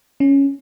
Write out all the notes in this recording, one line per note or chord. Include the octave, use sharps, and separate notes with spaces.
C#4